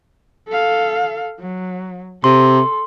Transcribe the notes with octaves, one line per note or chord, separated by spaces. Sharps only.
A4 F5
F#3
C3 A4 C6